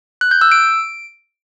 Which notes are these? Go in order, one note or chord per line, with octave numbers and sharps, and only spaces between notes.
F#6
G6
E6
D7